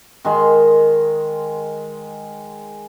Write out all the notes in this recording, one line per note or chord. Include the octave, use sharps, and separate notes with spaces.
D#3 G#3